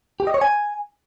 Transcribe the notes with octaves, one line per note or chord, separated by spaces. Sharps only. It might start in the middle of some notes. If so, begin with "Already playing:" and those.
G4
D#5
C#5
G#5